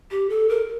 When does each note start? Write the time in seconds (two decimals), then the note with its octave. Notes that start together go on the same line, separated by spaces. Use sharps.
0.11 G4
0.29 A4
0.49 A#4